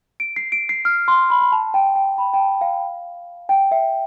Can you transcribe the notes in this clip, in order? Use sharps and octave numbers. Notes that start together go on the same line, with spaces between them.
D7
C7
D7
C7
F6
C6
B5
B5
A5
G5
G5
B5
G5
A5
F5
G5
E5